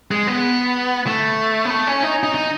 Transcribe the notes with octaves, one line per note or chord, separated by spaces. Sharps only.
G#3
B3
A3
B3
A3
C#4
D#4
D#4
D#4